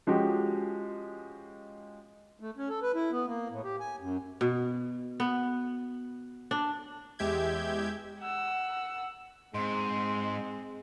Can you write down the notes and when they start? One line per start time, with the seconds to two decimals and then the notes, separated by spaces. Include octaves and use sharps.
0.07 F3 G#3 C#4 F#4 G4
2.40 A3
2.57 C#4
2.69 A4
2.82 B4
2.95 E4
3.11 B3
3.27 A#3
3.51 A2
3.64 G4
3.80 G#5
4.00 F#2
4.41 B2
5.20 B3
6.51 D4
7.19 E2 G#3 G4 E5 G6 G#6
8.20 F#5 E6
9.54 G#2 G#3 C4 C6